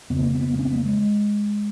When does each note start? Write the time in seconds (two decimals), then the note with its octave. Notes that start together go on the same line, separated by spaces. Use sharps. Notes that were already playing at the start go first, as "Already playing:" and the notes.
0.10 F2 C#3 B3
0.22 A#3
0.35 B3
0.54 A#3
0.59 C#4
0.65 B3
0.76 A#3
0.86 G#3